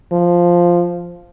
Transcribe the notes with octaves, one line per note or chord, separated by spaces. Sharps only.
F3